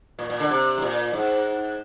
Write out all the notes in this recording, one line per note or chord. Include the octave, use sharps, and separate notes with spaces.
A#2
A#2
D3
C3
G#2
A#2
G#2